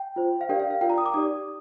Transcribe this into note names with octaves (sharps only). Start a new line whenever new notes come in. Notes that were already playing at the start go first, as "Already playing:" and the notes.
Already playing: G5
F4 C5
F5
D4 G4 A#4 D5 G5
F5
F5
F4 A#4 D5 G5
A#5
D#6
D6
D#4 G4 D5 D#6